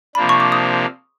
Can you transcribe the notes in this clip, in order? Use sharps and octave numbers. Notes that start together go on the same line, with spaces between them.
C3 F3 A#3 D4 B5
C#6
D6
D#6